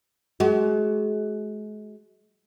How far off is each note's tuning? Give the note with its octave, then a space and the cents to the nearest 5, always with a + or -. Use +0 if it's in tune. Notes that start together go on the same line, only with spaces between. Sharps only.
G#3 +40 F#4 +35